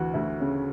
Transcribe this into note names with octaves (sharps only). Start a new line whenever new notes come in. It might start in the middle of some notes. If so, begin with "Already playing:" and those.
Already playing: D2 E3 F#4
D2 E4
C#3 C#4